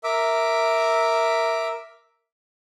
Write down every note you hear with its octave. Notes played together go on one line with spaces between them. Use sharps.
A#4 E5 D6